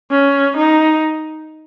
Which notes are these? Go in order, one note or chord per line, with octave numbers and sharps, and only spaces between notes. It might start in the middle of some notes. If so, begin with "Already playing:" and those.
C#4
D#4